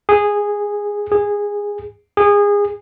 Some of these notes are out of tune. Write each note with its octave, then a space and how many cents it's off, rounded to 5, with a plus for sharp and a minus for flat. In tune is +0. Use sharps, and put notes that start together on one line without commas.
G#4 -10
G#4 -15
G#4 -25